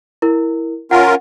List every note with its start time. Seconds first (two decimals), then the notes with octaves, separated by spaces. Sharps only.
0.22 E4 A#4
0.91 C#4 F4 A#4 F#5